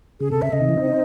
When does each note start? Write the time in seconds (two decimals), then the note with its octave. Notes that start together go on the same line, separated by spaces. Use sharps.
0.20 C#3 G#4
0.31 C3 A4
0.42 C#3 E5
0.53 C#3 D#5
0.61 C3 D#3
0.69 C#3 E3
0.77 C4 D#4